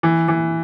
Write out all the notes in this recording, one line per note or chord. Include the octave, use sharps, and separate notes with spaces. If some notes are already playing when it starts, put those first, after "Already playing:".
E3
E3